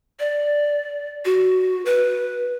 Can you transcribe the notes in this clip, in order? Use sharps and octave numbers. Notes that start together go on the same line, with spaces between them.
D5
F#4
B4